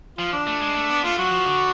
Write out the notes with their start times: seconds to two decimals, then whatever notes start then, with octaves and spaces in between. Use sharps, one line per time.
0.18 F3 F4
0.33 D4
0.47 A3
0.61 G#3
0.76 A3
0.90 B3
1.04 A3 F4
1.18 F#3 F#4
1.32 F3
1.46 D3